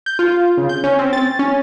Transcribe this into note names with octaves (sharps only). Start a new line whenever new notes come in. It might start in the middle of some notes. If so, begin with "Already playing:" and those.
G6
F4
C#3
G6
C#4
C4
A6
C#4